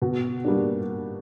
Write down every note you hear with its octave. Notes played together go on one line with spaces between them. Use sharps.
B2
G3 A#3 D4